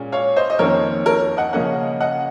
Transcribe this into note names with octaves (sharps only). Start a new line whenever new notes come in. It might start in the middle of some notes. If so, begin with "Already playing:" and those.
Already playing: A#2 G#3 C#4
C#5 F5
C5 D#5
D#5
F2 D#3 A#3 C#4 A#4 C#5
A#4 C#5
D#5 F#5
C#3 F3 A#3 C#4 D#5 F#5
D#5 F#5